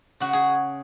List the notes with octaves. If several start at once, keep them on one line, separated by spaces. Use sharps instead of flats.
C#3 F#4
G#4